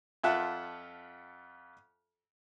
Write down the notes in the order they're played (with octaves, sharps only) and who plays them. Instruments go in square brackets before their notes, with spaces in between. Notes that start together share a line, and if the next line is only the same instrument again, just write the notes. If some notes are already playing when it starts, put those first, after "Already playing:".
[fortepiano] F2 F4 E5 F#5 A5 F#6